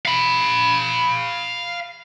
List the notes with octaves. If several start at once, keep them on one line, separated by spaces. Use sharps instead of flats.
F5 B5